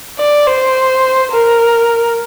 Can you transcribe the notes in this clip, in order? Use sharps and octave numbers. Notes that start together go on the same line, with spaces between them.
D5
C5
A#4